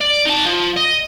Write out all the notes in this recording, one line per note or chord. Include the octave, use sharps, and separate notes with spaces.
D5
D#4 A5
F3
D#5